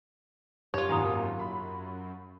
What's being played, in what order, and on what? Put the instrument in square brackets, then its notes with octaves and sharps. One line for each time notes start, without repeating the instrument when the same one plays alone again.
[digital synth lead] F#2 [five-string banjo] F4 C#5 [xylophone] G4
[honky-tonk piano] G#1 D#2 A#2 [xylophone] G#5 A#5 D#6
[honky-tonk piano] B5